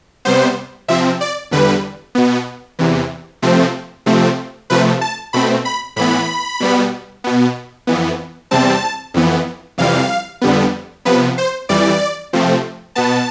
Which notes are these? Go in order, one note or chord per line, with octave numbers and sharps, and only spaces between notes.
C3 G3 B3 C5
C3 F3 C4 E5
D5
E2 D3 G3 B4
B2 B3
E2 C3 E3
C3 F3 A3 C4
C3 F3 A3 C4
C3 F3 A3 B4
A5
B2 A3 C4 B5
B5
A2 E3 B3 B5
B2 G3 B3
B2 B3
F2 E3 B3
E2 C3 G3 C4 A5
F2 E3 B3
F2 C3 E3 G3 F5
F2 D3 G3 B3
C3 F3 B3 B4
C5
F2 E3 G3 D5
C3 F3 A3 C4
B2 B3 A5